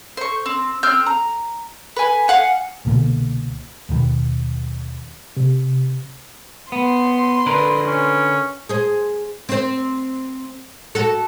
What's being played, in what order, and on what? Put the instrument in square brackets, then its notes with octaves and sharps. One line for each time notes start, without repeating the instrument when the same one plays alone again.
[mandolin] C5 C#6
C4
C4 F6 G6
A#5
B4 G#5
F5 F#5 G#5
[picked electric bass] C2 B2 D3 A#3
D#2 B2 D#3
[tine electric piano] C3
[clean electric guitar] B3 [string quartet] C6
[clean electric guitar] D3 A#4 B4
[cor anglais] C#4
[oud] G#4 C5
C4 C5
F#4 A4